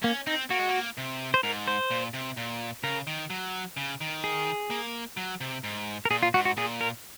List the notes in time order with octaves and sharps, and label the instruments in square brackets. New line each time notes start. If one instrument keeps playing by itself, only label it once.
[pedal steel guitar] A#3 [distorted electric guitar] C#4
[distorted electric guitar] C4 [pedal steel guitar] D#4
[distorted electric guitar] A#3 [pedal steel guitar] F#4
[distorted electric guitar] G#3
A#3
C3
[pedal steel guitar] C5
[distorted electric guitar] G#2 [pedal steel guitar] A#4
[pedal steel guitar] C5
[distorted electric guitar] A#2
C3
A#2
[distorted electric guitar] C#3 [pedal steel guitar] A#4
[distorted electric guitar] D#3
F#3
C#3
D#3
[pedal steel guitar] G#4
[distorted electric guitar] A#3
F#3
C3
G#2
[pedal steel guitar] A#4
[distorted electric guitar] A#2 [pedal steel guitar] G#4
[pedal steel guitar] F4
[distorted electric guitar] G#2 [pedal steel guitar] F#4
[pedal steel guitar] F#4
[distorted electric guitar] A#2 [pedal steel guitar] G#4
[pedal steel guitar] A#4